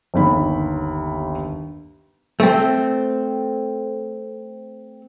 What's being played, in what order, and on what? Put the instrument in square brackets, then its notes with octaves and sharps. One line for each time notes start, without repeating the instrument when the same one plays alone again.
[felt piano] G1 D#2 B5
[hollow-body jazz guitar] A3 C4